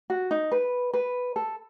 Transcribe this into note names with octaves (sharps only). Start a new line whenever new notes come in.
F#4
D#4
B4
B4
A4